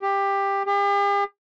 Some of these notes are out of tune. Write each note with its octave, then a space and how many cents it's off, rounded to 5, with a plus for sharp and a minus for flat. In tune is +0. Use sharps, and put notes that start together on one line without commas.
G4 +15
G4 +45